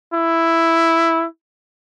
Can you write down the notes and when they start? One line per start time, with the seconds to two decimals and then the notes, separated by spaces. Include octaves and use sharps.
0.14 E4